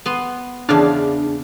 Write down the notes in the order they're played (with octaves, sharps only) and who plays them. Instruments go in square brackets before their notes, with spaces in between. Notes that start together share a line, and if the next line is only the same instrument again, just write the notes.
[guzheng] B3 C6
[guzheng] E2 C#3 F5 [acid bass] D4